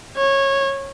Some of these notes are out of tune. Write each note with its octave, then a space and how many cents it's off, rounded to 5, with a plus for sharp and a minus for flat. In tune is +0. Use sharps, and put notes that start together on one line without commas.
C#5 -15